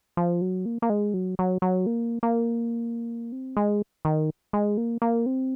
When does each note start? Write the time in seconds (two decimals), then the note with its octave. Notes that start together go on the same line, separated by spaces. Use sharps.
0.17 F3
0.41 F#3
0.66 A#3
0.82 A#3
0.90 G#3
1.14 F#3
1.39 F#3
1.62 F#3
1.86 A#3
2.23 A#3
3.32 C4
3.57 G#3
4.05 D#3
4.53 G#3
4.77 A#3
5.02 A#3
5.26 C4